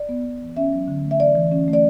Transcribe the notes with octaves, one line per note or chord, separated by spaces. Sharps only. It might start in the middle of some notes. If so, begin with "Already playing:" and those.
Already playing: D5
B3
B3
E3
C#4 E5
F#3
D3
A3
E5
E3 D5
E3
C#4
A3
D5